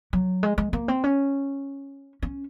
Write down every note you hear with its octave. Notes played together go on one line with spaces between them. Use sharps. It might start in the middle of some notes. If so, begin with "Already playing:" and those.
F#3
G#3
G#3
A#3
C4
C#4
C#4